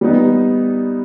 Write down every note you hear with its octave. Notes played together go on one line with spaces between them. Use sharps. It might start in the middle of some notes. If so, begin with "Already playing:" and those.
G3 B3 D#4